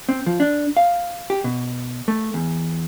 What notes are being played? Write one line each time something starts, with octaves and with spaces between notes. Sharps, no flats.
C4
F3
D4
F5
G4
B2
A3
E2